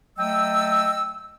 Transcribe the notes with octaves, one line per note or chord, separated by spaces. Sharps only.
F#3 A3 D#5 G5 E6